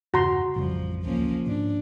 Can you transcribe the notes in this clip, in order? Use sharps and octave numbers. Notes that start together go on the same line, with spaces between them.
E2 G2 C#3 F#4 A#5 C6
A1 F2 C#3 F3 G3
D2 F3 A#3 C#4
G#2 D4